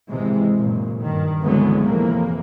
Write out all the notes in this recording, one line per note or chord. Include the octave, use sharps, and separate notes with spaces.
G#1 C3 E3 G#3
F#1 A#2
G2 D#3
C2 D3 E3 F#3 G#3 B3
F2 A2 C3 E3 A#3